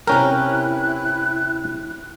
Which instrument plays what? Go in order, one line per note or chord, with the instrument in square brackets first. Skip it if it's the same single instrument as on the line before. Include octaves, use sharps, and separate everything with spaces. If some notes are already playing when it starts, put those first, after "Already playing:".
[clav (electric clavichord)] C3 C#4 A#4 [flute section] E4 F#6 [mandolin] G4 B4